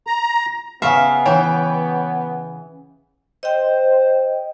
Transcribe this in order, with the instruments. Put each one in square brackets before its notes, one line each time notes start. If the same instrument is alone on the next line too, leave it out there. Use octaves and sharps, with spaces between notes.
[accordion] A#5
[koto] C#3 E5 [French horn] B3 [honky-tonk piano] F5
[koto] E3 [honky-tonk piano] C#5 G5
[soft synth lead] C5 [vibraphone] D#5 G5